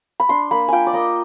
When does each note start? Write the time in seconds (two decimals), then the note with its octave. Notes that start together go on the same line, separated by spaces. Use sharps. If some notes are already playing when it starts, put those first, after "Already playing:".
0.20 B5
0.29 D4 C6
0.51 A#3 B5
0.68 F4 G5 G#5
0.87 D5
0.93 A#3 D#5